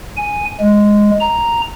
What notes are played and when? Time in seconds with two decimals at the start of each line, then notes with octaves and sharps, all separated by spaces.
0.17 G#5
0.60 G#3
1.20 A#5